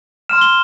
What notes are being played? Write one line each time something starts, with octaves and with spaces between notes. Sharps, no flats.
C6 F6 E7
G7